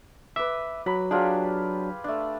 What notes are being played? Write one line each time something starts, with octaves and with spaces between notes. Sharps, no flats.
B4 E5 D6
F#3 B5
F#3 D4 F4 G4 G#4
A3 D4